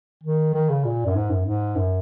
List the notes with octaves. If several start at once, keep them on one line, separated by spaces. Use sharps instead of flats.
D#3
D#3
C#3
A#2
F#2
G#2
F#2
G#2
F#2